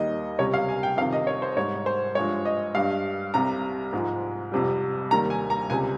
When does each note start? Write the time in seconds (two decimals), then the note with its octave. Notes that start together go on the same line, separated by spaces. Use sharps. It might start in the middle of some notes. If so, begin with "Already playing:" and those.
Already playing: D#2 D#3 G3 D#5
0.39 C#2 C3 G3 C#5
0.54 F5
0.69 G#5
0.83 G5
0.97 F2 C3 D#3 F5
1.13 D#5
1.27 C#5
1.42 C5
1.56 G#2 G3 C#5
1.86 C5
2.15 G2 F3 G#3 C#5
2.45 D#5
2.75 G2 G3 F5
3.34 C2 C3 G3 A#5
3.93 G#2 F3 G#3
4.52 F2 C3 G3
5.11 D#2 D#3 G3 A#5
5.30 G#5
5.50 A#5
5.70 C#2 C3 G3 G#5